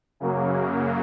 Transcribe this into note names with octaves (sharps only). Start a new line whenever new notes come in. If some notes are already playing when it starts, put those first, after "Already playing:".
F#2 C#3 F#3 A#3